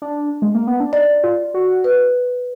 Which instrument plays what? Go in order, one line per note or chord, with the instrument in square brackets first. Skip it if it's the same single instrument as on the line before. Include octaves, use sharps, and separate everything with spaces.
[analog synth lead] D4
G#3
A#3
B3
D4
[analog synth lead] D#4 [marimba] D5
[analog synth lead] F4
F#4
[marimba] B4